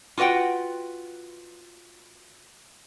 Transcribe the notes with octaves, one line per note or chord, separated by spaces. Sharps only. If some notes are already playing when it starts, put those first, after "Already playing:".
F4 F#4 B4 F#5 G5